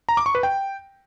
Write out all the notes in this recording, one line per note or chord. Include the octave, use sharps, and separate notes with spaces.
A#5
D6
C#6
B4
G5